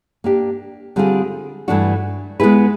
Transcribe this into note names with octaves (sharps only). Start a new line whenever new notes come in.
A#3 D4 G4
D3 G3 C4 F4 G#4
G2 E3 A3 D4 F#4
G#3 B3 E4 G#4 B4